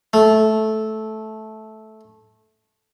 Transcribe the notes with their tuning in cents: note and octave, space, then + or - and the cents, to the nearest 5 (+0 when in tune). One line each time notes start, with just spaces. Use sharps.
A3 -10